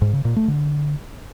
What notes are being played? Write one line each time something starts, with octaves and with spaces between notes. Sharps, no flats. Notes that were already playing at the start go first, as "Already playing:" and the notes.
G#2
C#3
A#2
A3
D3